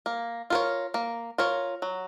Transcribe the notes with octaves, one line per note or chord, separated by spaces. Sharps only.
A#3
F4 A#4 C#5
A#3
F4 A#4 C#5
F#3